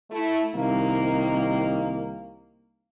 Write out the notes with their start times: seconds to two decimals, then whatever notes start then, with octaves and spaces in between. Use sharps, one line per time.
0.11 A3 E4
0.54 C2 D#3 A#3